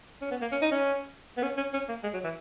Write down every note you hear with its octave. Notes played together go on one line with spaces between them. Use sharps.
C#4
B3
A#3
C#4
D#4
C#4
B3
C#4
C#4
C#4
A#3
G#3
F#3
E3